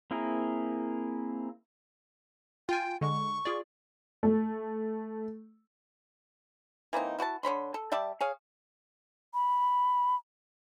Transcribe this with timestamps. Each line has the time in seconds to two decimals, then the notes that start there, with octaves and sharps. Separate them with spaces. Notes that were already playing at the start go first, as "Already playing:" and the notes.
0.11 A#3 C4 E4 G#4 A#4
2.69 F4 G5 G#5
3.01 D3 G#3 C#6
3.45 F4 G#4 D5
4.23 A3
6.93 E3 A#3 C4 D#4
7.18 E4 F#4 C5 A5
7.43 D3 C#5 B5 C6
7.74 A4
7.92 G3 D5 E5 A5
8.21 G#4 C#5 F5
9.34 B5